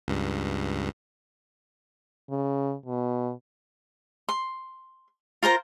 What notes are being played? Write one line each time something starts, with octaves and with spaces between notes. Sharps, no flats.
C#2 G2
C#3
B2
C6
F4 A#4 C5 A#5